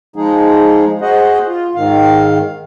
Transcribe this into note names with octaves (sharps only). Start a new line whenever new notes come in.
F3 G#3 D#4 G#4
F#4 G#4 C5 D#5 F#5
F4
G#2 D#3 F5